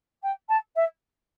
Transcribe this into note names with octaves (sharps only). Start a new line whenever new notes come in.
G5
A5
E5